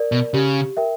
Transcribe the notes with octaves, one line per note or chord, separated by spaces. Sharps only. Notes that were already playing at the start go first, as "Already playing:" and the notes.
Already playing: A#4 D5
B2
C#3 G4
A#4 E5 G5